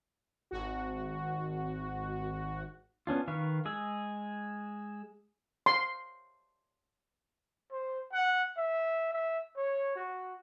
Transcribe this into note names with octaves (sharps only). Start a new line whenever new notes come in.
G#1 F#4
B3 C#4 D4 F4
D#3 B4 F5 C#6
G#3 G#4 E6
C6
C5
F#5
E5
E5
C#5
F#4